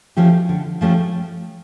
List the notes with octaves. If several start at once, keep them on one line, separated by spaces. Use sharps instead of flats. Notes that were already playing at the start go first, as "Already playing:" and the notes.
F3 A3 C#4 G4
D3
F3 A3 C#4 G4